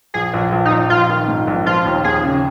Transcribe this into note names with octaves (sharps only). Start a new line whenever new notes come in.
A#1 G#4
A#1
A#1
D#4
A#1
A#1 F4
D#3
G#2
A#1
F3 F4
D#2
D#2 G#4
C#3